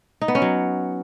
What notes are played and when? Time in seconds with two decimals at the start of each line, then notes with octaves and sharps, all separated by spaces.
0.22 D#4
0.28 B3
0.35 C#4
0.42 F#3